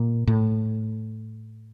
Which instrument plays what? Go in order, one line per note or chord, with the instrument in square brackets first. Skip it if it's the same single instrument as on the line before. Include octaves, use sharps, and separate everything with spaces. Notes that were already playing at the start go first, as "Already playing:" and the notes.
Already playing: [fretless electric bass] A#2
A2